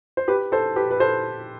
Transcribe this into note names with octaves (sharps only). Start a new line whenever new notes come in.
C5
G4 B4
A4 C5
G4 B4
B4
A4 C5